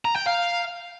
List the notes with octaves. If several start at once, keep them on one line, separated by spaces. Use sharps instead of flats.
A#5
G5
F5